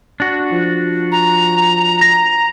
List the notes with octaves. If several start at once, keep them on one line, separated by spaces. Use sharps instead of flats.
D4 F#4
F3
A#5
A#6